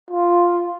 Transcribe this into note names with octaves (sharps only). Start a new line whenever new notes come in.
F4